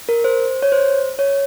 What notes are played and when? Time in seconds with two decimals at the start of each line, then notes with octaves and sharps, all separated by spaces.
0.09 A#4
0.24 C5
0.62 C#5
0.72 C5
1.19 C#5